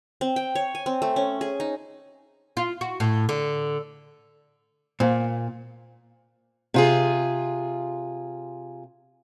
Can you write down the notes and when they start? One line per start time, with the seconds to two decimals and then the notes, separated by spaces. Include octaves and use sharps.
0.21 C4
0.36 G5
0.55 C#5
0.75 G#5
0.86 C4
1.02 A3
1.16 C#4
1.41 G#4
1.60 D#4
2.57 F4
2.81 F#4
3.00 A2
3.29 D3
5.00 A#2 A#3 C5
6.74 C3 F4 G#4